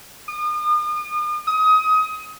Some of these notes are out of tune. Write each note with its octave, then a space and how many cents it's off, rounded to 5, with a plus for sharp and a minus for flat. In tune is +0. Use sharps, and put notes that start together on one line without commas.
D#6 -40
D#6 +25